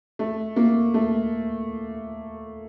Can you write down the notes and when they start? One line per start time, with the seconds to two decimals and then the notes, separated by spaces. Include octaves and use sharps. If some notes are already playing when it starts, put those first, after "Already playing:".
0.19 A3
0.56 A#3
0.94 A3